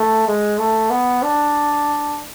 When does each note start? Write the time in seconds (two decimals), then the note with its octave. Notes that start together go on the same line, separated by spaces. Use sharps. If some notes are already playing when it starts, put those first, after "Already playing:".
Already playing: A3
0.28 G#3
0.58 A3
0.90 B3
1.23 D4